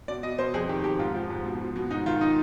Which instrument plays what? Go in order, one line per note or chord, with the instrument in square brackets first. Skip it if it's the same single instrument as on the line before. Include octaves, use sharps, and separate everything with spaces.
[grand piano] B2 D5
B2 D#5
B2 C5
F2 G#4
D#3 G4
F2 G4
G#2 F4
F3
G#2
B2
B2
B2
G#2 D#4
D#3 F4
D#4